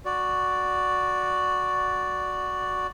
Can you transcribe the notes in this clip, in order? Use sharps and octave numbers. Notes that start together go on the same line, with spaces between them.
F#4 D5